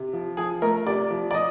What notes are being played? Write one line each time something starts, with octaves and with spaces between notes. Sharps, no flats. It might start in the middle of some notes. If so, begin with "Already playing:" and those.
Already playing: C3
F3
F3 G#4
A3 A#4
C3 D5
F3
D5
F3 D#5